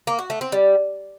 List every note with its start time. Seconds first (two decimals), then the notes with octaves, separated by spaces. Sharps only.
0.07 A#3
0.19 F#4
0.30 A3
0.41 C4
0.52 G3